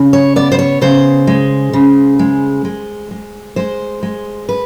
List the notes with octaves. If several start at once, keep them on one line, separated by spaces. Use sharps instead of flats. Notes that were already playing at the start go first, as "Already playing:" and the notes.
Already playing: C#3
C#5
B3 D5
C5
C#5
C#3 C5
G#3
C#3
G#3
G#3
G#3
G#3 C5
G#3
B4